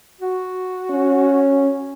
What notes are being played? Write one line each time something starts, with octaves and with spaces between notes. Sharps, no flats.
F#4
C#4